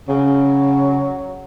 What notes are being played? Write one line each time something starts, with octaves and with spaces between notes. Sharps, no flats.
C#3 F#3